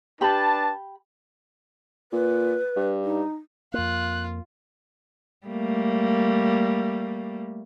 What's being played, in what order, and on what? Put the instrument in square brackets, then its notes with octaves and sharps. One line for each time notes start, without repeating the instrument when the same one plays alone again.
[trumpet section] D4 B4 A5 [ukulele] G4 B5
[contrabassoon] A#2 [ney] B4
[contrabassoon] G2
[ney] D#4
[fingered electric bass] F2 A#3 [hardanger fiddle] F4 [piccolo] F#6
[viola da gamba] G3 A3 A#3